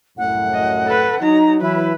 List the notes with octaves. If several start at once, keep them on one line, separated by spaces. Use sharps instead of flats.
C2 F#2 A2 F#5
D#5
A4 B4
F#3 D#4 A#5
E3 F#3 E4 B4